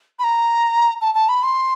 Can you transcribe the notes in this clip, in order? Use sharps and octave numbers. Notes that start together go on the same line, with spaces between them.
B5
A#5
A5
A5
B5
C6